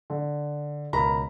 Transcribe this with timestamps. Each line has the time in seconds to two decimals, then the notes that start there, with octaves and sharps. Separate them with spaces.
0.10 D3
0.93 C#2 B2 A#4 A#5 B5